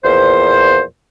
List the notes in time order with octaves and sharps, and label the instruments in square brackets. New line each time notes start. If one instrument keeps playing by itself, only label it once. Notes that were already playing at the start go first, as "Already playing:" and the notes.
[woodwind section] E2 A#2 F3 C5